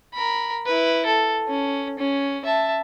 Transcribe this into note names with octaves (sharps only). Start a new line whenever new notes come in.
A#4 B5
E4 B4
A4
C#4
C#4
E5 A5